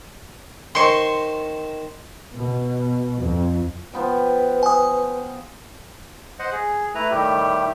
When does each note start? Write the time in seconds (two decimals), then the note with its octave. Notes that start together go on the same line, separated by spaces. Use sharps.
0.75 D#3 C5 D#5 C6 C#6
2.36 B2
3.19 F2
3.94 F3 B3 B4 G5
4.63 G#5 D#6
6.39 C5 D#5 F#5
6.52 G#4
6.95 A3 E4 B4 A#5
7.11 A2 D#3 G3 A3 G4